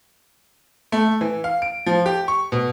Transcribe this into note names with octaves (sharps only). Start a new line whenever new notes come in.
A3
E3
F5
D7
F3
G4
C#6
B2